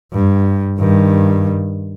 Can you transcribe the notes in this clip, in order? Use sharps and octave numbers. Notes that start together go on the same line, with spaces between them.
G2
G2 D#3